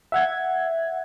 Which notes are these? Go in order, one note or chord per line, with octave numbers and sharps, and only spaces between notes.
E5 F#5 G#6